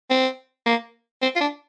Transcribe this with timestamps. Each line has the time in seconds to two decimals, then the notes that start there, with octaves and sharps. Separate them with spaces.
0.10 C4
0.66 A#3
1.22 C4
1.36 F4
1.41 D4